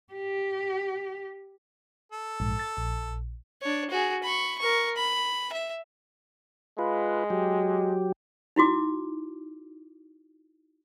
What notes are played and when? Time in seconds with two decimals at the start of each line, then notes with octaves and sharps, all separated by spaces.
0.13 G4
2.12 A4
2.40 A#1 G#2
2.59 A6
2.77 A#1
3.62 D4 C#5
3.90 F#4 G#4
4.23 B5 C#6
4.59 A#4 C#6
4.97 B5
5.52 E5
6.79 G#3 F4 B4
7.30 F#3 G4
8.56 D#4 E4 F#4 D6